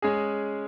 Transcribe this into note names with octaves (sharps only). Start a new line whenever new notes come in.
G#3 C#4 G#4